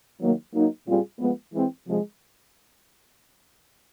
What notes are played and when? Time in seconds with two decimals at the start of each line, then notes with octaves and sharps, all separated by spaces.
0.20 D#3 F#3 A#3
0.53 F#3 A#3 D#4
0.86 A#2 G3 C4 F4 G#4
1.19 F3 G#3 B3
1.53 E3 G#3 C4
1.86 C3 F3 G#3